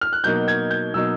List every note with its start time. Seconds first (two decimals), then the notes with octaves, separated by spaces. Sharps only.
0.01 F6
0.13 F#6
0.24 B2 F#3 A#3 D#4 G6
0.48 G#6
0.71 G6
0.94 B2 F#3 A#3 D#4 E6